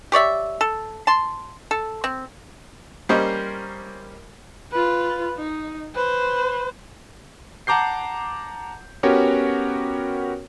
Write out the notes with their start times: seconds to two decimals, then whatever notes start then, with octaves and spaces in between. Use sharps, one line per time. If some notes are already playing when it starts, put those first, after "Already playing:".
0.12 G4 C#5 D5 E5
0.61 A4
1.07 A5 C6
1.71 A4
2.04 C4
3.09 G3 A#3 C#4 A#4 C5 D#5
4.72 F4 B4
5.37 D#4
5.95 B4 C5
7.67 F#5 A5 A#5 D6 G6 C7
9.03 B3 C#4 F#4 G4 A#4 C#5